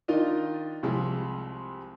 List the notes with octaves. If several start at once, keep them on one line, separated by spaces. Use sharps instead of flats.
D#3 D4 D#4 F4 A#4 D#5
C2 C3 F3 G#3